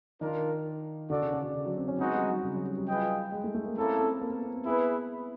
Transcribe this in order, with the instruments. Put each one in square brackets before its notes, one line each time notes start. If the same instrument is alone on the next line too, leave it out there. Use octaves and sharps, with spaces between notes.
[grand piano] D#3 [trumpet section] D4 F4 A#4
[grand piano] D3 [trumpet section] F#4 A4 D5
[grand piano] C#3
C#3
C#3
F#3
C4
C#4
[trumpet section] G#3 B3 D#4 F#4 [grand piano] C4
[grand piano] G3
F#3
C#3
F#3
G3
G3
[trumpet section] F4 G#4 B4 D#5 G5
[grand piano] G#3
A3
A3
A#3
[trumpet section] A#3 C#4 E4 A4 [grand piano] C4
[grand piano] C4
A#3
B3
C4
C4
[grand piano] B3 [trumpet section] E4 G#4 B4